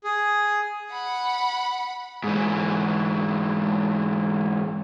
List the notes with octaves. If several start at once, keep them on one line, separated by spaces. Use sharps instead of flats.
G#4
F#5 B5
G#2 E3